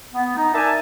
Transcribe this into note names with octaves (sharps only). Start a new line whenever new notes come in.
B3
D#4
A#4 D5 E5 G#5 A5